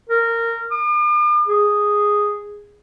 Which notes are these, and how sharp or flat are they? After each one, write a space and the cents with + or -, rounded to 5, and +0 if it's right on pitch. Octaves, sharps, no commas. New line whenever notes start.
A#4 -15
D6 +45
G#4 -5